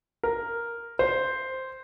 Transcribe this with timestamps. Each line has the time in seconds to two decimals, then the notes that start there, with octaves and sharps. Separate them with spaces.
0.23 A#4
0.99 C5